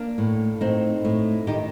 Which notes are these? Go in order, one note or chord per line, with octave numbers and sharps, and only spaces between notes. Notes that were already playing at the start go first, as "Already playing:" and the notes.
Already playing: A#3 D4
A2
A2 C4 D#4
A2
D#3 D#4 G4